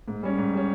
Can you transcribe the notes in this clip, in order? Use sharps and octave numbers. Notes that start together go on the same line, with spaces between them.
G#2
G3 C#4
G#2
G3 C#4